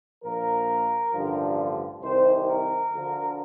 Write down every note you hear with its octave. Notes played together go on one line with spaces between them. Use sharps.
A#1 A#2 F3 A#4
A1 G2 D3 F3
C2 C3 D#3 C5
A#4
D2 D3 F3